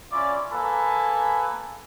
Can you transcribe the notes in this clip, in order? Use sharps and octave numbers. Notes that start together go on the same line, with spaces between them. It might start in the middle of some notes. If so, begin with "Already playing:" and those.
C#4 E4 F4 D5
A#3 A4 B4 G#5 B5